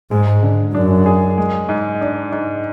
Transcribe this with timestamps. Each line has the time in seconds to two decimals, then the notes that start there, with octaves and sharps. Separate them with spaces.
0.11 G#2 G#3
0.42 D3
0.74 F#2 D4
1.06 G#4
1.38 G#3
1.69 G#2
2.01 D4
2.32 G#2